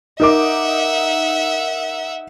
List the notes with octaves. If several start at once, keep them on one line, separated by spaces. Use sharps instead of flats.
D#4 A#4 E5 F#5 D6